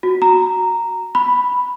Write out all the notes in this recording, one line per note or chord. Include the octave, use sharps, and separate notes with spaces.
F#4
A#5
B5